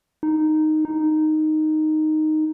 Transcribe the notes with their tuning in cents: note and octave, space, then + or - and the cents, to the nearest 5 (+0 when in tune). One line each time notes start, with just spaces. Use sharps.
D#4 -5
D#4 -5